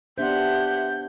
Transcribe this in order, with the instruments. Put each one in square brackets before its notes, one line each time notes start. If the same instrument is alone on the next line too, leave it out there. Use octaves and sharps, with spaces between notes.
[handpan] B3 D4 C5 [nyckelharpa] G4 F#5 [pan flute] E5 [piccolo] G6